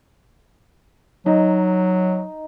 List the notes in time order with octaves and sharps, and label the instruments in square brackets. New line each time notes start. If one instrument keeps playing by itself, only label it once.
[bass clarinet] F#3 [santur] D#4